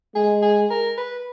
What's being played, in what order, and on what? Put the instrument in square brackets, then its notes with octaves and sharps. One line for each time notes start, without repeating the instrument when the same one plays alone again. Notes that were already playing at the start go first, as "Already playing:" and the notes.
[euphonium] G#3 [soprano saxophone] G#4
[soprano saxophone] G#4
A#4
B4